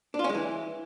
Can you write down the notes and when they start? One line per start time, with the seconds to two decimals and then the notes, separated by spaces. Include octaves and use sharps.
0.14 D4
0.19 F4
0.24 C#4
0.29 G#3
0.35 E3